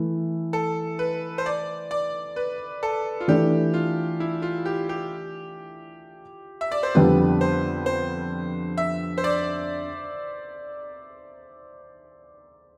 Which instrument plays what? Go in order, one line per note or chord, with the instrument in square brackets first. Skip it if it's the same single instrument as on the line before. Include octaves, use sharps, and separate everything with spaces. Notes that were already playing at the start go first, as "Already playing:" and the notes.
Already playing: [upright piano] E3 A3 E4
[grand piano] A4
B4
C5
D5
D5
B4
A4
F4
[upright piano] E3 A3 D4 [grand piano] G4
[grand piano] F4
E4
F4
G4
G4
E5
D5
C5
[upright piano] F2 D3 G3 B3 [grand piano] B4
[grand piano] C5
C5
E5
C5
D5